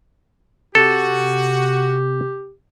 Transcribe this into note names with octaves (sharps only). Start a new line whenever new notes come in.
C3 F#4 G4 A4